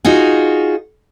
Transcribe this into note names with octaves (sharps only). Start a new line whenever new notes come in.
D#4 F4 F#4 G#4